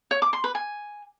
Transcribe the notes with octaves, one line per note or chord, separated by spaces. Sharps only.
C#5
D6
C6
B4
G#5